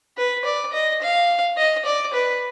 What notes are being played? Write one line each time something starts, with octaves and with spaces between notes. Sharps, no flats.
B4
D5
D#5
F5
D#5
D5
B4